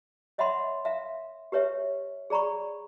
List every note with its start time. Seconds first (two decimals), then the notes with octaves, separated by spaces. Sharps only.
0.38 C#5 D#5 E5 F#5 B5 C6
0.85 E5 F5
1.52 G4 B4 C#5 E5
2.30 G#4 D5 A#5 B5 C#6